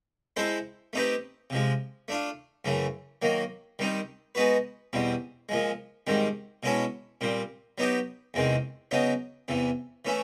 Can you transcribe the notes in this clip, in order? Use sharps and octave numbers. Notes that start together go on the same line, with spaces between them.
G#3 C4 E4 A4 C5
A3 C4 D#4 G4 B4
C3 F3 G#3
A3 D4 F4
F#2 C#3 E3 A3
D#3 F#3 A#3
D#3 G3 C4 D#4
G#3 B3 D#4 F#4 B4
E2 B2 G3 C4
A#2 F3 G#3
G#2 D#3 G3 C4
B2 G#3 C#4 E4 A4
A#2 G3 C4
F#3 B3 D#4 G4
E2 C3 D#3 G#3 C4
C#3 F#3 B3 D#4
E2 C3 E3
E3 A3 C#4 E4